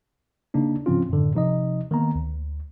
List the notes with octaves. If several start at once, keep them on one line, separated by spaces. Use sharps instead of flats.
C#3 A#3 D4 D#4
G#2 C#3 F3 C4 C#4 F4
F#2 A2 D3
C3 F3 D#4 D#5
D#3 A#3 B3 A#5
D2